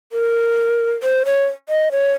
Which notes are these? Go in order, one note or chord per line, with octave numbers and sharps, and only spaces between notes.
A#4
C5
C#5
D#5
C#5